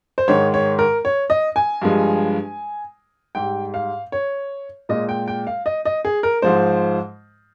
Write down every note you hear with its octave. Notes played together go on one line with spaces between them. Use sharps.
C5
G#2 D#3 G#3 C#5
C#5
A#4
C#5
D#5
G#5
G2 F3 G#3
G#2 G3 G5
F5
C#5
A#2 G#3 D#5
G5
G5
F5
D#5
D#5
G#4
A#4
G#2 F3 G#3 C5